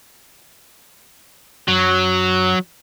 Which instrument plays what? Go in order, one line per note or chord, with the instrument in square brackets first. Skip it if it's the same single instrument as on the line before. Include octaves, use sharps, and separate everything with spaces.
[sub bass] F#2 [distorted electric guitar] F#3